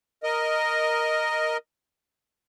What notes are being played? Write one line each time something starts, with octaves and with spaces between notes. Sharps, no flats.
A#4 D#5